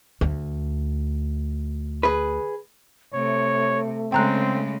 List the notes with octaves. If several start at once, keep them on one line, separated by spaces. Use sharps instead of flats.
D2
G#4 B4
C3 A3 C#5
C#3 G#3 C4 G5 A#5 F#6